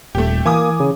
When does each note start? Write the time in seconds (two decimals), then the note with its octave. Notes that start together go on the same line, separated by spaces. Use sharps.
0.15 D#1 A3 G4
0.46 E3 A#3 G#5 D6 D#6
0.80 C#3